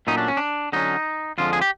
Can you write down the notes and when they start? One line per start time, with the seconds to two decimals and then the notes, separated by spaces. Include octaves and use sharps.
0.07 A#2 F#3 A3 C#4 D#4
0.18 D4
0.28 C#4
0.37 D4
0.72 D3 F#3 A#3 C#4 D#4
1.38 F2 D3 F3 G#3 F4
1.53 G#4
1.61 G4